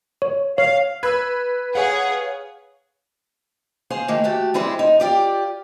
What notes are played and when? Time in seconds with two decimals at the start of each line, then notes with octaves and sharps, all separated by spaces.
0.22 C#5
0.58 C#5 F5
1.03 B4 E6 F#6 G#6
1.75 G#4 C#5 F5 F#5
3.90 G#4 C5 F5
4.08 D#3 A3 A#3
4.24 A3 F#4 G4
4.54 G3 G#3 C4 E4 G#4
4.79 D#4
5.00 F4 G4 D5